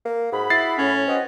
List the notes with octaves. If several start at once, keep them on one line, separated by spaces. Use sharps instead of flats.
A#3
G#2 F#4 G#4 B5
E4 A6 C7
A2 C#4
C4 F#4 B4 D#5